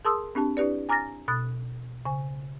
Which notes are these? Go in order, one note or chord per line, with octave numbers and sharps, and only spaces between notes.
G#4 A#4 A5 C6 D#6 E6
C4 D4 G4 A5
D4 E4 G4 B4 D5
G#5 A#5 D6 F6 A6 A#6
B2 D#6 F#6 A6
C#3 G#5